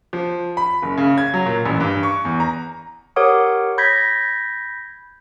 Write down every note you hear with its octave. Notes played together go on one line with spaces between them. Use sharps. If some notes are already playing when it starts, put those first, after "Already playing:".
F3
B5
F#1
C#3
G#6
F#3
A#2
A1
G2
C#6
E2
A#5
G4 A#4 C#5 F#5 D6 D#6
B5 G6 G#6 A#6 B6